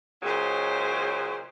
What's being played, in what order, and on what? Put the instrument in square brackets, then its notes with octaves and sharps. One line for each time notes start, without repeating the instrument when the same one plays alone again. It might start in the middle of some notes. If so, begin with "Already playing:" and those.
[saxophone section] A#2 C#3 F#3 [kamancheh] G#3 C5